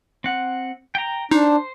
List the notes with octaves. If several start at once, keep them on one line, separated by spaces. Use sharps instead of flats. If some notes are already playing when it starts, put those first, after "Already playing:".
C4 F#5
G5 A#5
D4 D#4 C5